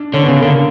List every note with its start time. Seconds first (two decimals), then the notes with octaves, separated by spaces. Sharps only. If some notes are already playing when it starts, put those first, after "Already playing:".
Already playing: D4
0.13 D3 C#4
0.22 B3
0.28 C#3
0.42 D3 A#3